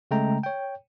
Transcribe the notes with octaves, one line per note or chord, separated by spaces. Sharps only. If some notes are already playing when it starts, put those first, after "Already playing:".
C#3 G#3 A3 G5 A#5
C#5 G5